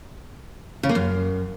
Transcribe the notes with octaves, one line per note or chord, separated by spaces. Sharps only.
C#3
A#3
F#2